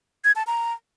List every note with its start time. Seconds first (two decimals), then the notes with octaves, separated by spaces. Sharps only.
0.24 G#6
0.36 A5
0.47 A#5